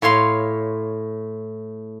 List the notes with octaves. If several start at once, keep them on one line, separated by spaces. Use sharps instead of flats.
A2 C#5 F5 C6